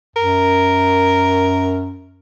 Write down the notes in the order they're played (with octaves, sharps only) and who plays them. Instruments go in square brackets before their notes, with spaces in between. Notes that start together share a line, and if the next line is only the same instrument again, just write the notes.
[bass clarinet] F#2 [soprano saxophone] A#4